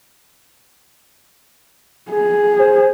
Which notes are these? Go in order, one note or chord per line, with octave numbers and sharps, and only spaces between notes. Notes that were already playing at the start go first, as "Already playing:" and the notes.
G#4
C5